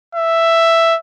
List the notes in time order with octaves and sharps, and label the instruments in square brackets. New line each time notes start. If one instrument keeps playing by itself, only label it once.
[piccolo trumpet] E5